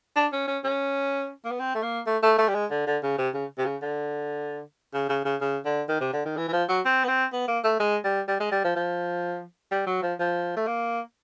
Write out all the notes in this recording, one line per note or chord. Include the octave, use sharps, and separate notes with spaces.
D4
C#4
C#4
C#4
A#3
B3
C4
A3
A#3
A3
A3
A3
G3
G#3
D3
D3
C#3
C3
C#3
C3
C#3
D3
C#3
C#3
C#3
C#3
D3
D#3
C3
D3
D#3
E3
E3
F3
F#3
C4
B3
C4
B3
A#3
A3
G#3
G3
G3
G#3
G3
F3
F3
G3
F#3
F3
F3
A3
A#3